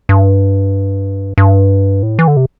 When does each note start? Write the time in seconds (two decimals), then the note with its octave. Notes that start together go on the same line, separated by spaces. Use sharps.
0.09 G2
1.38 G2
2.03 A2
2.19 E3
2.28 D3
2.37 C3